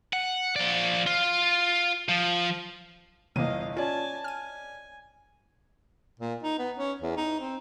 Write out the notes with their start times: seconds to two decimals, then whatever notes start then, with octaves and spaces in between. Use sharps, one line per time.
0.13 F#5
0.56 F3 D5
1.07 F4
2.09 F3
3.36 G1 E2 C3 A#3 D#5 F5 D#7
3.77 C#4 F4 D5 G#5 A5
4.24 G#5 F6 D#7
6.20 A#2
6.43 D#4
6.59 B3
6.77 C#4
7.02 E2
7.17 D#4
7.40 C4